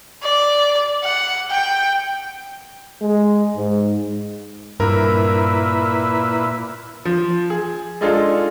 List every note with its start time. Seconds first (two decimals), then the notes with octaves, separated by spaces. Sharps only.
0.23 D5
1.03 F#5
1.50 G5
3.02 G#3
3.57 G#2
4.80 G2 A#2 E4 A#4 B4
7.05 F3
7.50 G#4
8.01 G#3 D4 D#4 F4 G#4 A4